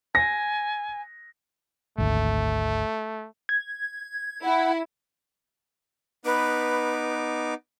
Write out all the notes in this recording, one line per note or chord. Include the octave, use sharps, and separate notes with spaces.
G#5 A#6
G#1 D2 A3
G#6
E4 F#5
B3 D#4 B4 D6